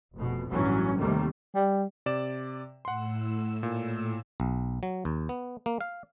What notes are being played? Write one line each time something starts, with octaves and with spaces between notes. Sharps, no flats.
F1 B2
A1 G2 E3 F#3 C#4
D#2 C3 D#3 G3 A3
G3
C3 D5 E7
A2 F#5 C6 E6
A#2
B1
F#3
D#2
B3
A#3
F5